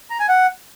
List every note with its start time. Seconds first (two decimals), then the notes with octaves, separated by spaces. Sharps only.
0.10 A#5
0.19 G#5
0.29 F#5